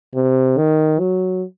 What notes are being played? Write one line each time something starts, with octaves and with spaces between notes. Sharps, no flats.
C3
D#3
F#3